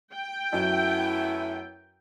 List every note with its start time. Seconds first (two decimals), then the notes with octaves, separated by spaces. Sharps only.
0.14 G5
0.53 F#2 A3 B3 E4